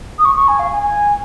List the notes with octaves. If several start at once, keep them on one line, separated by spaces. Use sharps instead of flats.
D#6
C#6
C#6
G#5
F5
G#5
G#5